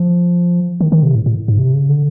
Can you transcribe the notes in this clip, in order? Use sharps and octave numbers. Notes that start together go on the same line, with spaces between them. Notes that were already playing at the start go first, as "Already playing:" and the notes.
Already playing: F3
D#3
D#3
C3
A2
A2
G#2
C3
C#3
D3